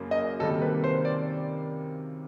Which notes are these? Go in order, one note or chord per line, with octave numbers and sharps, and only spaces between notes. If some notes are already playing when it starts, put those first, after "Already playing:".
Already playing: F#2 C#3 F#3 A#3
D#5
C3 D#3 G3 A#3 A4
B4
C5
D5